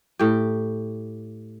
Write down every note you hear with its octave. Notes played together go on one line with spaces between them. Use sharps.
A2 G4